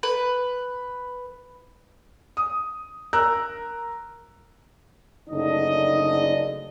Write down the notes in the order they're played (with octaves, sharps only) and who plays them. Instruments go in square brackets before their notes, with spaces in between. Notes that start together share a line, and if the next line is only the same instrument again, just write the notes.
[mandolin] B4
[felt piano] D#6
A#4 A#5 E6 F#6
[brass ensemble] F#1 D3 A3 D4 D#4 D#5